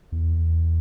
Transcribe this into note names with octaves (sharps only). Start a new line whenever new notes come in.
E2